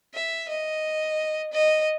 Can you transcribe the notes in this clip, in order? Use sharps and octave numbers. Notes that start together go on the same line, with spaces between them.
E5
D#5
D#5